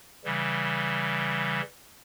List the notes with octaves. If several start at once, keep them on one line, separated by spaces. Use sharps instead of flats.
C#3 E3 G3